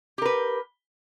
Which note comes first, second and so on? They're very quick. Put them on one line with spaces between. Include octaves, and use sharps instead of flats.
G4 A#4 B4